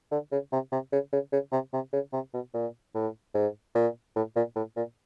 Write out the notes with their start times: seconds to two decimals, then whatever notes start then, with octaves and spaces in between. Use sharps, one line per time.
0.12 D3
0.32 C#3
0.52 C3
0.72 C3
0.92 C#3
1.13 C#3
1.32 C#3
1.52 C3
1.73 C3
1.93 C#3
2.13 C3
2.34 B2
2.54 A#2
2.95 A2
3.34 G#2
3.75 A#2
4.16 A2
4.36 A#2
4.56 A2
4.77 A#2